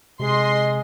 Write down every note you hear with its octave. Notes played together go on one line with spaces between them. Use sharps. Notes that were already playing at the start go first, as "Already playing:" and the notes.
C3 G#3 D#5 C6